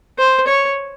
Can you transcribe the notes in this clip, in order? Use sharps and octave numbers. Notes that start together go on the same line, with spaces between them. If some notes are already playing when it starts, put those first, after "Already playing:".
C5
C#5